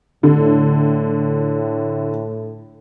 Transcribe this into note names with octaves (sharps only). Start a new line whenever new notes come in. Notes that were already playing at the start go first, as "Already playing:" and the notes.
A2 D3